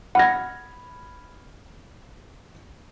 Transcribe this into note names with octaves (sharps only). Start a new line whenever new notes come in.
F#5 B5 F6 G#6 A#6